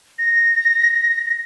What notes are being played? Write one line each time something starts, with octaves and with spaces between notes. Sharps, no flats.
A#6